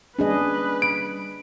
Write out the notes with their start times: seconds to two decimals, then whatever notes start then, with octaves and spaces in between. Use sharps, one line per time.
0.19 G3 A#3 C#4 D4 G#4 B4 D#5
0.82 D7